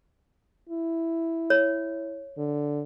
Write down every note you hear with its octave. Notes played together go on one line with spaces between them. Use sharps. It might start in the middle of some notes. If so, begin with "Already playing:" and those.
E4
C#5
D3